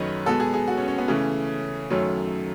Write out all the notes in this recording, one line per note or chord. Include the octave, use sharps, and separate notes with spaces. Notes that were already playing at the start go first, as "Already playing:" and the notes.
Already playing: F#2 D#3 F#3 A3 B4 C#5 D#5
B2 G#3 B3 A4
G#4
G#4
F#4
C#4
C#4
B3
C#3 E3 A3 C#4
F#2 D#3 F#3 A3 C#4